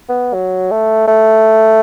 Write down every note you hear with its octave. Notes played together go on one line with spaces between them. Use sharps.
B3
F#3
A3
A3